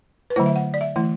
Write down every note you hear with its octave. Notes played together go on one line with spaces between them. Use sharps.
B4
D3 F#3 A3 E4 C5
E5
F#5
D5
E5
E3 A3 E4